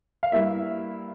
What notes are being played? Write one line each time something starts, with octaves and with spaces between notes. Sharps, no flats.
F5
G2 G3 A#3 E4 E5